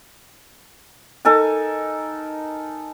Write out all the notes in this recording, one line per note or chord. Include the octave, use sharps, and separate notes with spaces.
D#4 A4 A#4 G#5